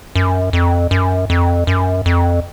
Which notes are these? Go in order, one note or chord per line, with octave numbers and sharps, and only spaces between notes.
F#2
F2
F#2
F2
F#2
F2